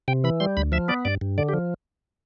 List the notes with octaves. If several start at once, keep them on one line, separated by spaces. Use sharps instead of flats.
C3 G5
E3 B5
G3 C6
D2 B5
F3 E5
B3 D5
G2 D5
G2
D3 D5
G4
F3